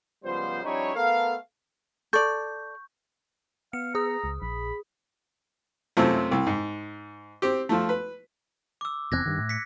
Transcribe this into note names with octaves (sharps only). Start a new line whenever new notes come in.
C#2 F3 G3 B3 C5
F3 G3 C#4 D#4 E4 C#5
A3 B3 A4 A#4 F5
A4 D5 C#6 G6
B3 F5 C#7
G#4 A#5 D#6
C#2
A#1 B5
F#2 C3 A3 C4 F4
C2
G#2
C4 G4
F3 A3
B4
D6 E6
F1 E2 C4 F#6 G#6 A#6
G2 D#3
A2
B6 C#7